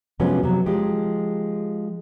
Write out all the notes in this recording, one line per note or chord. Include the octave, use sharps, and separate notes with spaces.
C3 F3 F#3 G#3 B3 C#4
C3 F#3
F3 G#3 G4